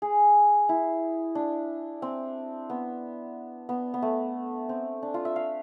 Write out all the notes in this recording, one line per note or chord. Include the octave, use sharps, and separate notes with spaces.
G#4
E4
D4
C4
B3
B3
B3
A3
C4
D4
F4
E5
F5